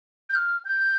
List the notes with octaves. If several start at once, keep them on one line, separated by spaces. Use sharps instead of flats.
G6
F6
G6